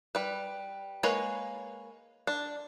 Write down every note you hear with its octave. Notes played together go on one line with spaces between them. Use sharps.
G3 B4
G#3 A#3 B4 C#5
D4